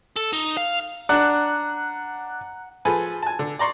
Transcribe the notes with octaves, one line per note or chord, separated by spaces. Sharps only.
A4
D#4
F5
D4 F#5 A#5 F#6
F3 G#4 A4 B4
G#5 A5
D3
D5 A#5 C6 C#6